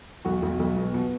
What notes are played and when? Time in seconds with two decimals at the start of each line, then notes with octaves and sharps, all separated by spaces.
0.25 B1 F#4
0.42 B1
0.59 B1
0.77 B2
0.94 B2